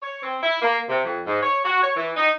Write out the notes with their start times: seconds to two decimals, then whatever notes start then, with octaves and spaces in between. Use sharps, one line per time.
0.02 C#5
0.23 C4
0.43 E4
0.62 A#3
0.89 C3
1.05 F2
1.26 G#2
1.42 C#5
1.65 F#4
1.83 C#5
1.96 E3
2.16 D#4